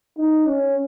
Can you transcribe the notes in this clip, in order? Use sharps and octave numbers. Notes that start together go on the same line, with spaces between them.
D#4
C#4